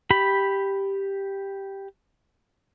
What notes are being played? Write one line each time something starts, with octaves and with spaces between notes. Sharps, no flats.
G4 B5